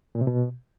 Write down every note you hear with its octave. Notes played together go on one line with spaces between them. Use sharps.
A#2
C3
B2